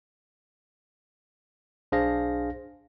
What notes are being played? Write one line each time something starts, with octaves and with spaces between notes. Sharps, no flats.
B1 D4 G#4 C5 F5 A#6